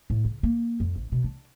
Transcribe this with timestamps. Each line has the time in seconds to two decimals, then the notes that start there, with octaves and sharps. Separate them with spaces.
0.10 A2
0.25 C#3
0.43 A#3
0.80 F2
0.96 A1
1.12 B2
1.24 D4